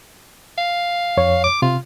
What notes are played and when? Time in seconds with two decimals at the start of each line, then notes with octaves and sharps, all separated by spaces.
0.58 F5
1.17 F2 C#5
1.44 D6
1.62 C3 F4